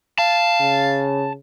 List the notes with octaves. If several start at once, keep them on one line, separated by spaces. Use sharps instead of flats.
F5 A5
C#3